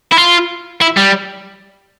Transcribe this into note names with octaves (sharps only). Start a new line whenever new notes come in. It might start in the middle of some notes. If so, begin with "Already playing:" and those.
E4
F4
E4
G3